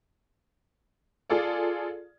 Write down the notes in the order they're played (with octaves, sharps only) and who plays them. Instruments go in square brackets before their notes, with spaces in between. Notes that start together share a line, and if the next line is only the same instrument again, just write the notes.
[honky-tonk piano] F4 G#4 A4 D5